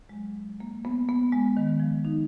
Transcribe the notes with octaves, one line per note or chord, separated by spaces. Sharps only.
G#3
F#3
A#3
B3
B3
G#3
D#3
F3
D#4